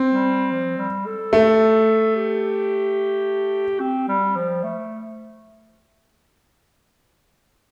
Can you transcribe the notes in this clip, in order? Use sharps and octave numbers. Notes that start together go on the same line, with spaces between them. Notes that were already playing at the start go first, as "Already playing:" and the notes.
Already playing: C4
G3
F3
G3
A4
A3
G4
C4
G3
F3
A3